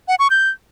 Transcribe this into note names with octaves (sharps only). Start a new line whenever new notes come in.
F#5
C#6
G6